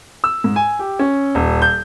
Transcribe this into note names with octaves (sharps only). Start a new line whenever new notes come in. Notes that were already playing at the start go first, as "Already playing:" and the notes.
E6
G#2
G#5
G4
C#4
D#1
G6